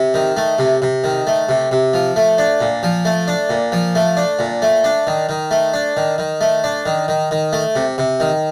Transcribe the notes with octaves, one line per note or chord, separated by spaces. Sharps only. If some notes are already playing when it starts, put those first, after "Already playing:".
Already playing: C3
D#3
A3
C3
C3
D#3
A3
C3
C3
F3
A3
D4
A#2
F3
A3
D4
A#2
F3
A3
D4
A#2
A3
D4
D#3
D#3
A3
D4
D#3
D#3
A3
D4
D#3
D#3
D#3
A3
C3
C3
D#3